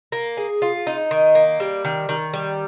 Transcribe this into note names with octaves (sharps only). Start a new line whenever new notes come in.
A#3
G#4
F4
D#4
D#3
A#3
G3
D#3
D#3
G3